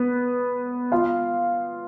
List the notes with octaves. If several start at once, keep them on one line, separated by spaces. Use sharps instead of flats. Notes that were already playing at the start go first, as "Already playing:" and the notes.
Already playing: B3 B4
F4 F5